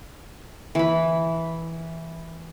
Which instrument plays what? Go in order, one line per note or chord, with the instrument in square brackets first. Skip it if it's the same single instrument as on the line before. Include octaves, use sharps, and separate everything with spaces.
[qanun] E3 B5